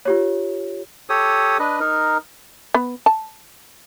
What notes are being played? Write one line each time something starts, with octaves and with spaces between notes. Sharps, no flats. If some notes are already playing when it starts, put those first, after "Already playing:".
F4 G4 C#5
G4 A4 C#5 D#6
D4 B4 D#5
D#4 A#4
B3
A5